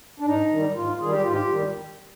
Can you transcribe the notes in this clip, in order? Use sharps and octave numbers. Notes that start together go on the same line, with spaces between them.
D4
G#2 D#4
D#3 G3
G#2 F4
D#3 G3 G#4
G4
G#2 F4
G4
D#3 G3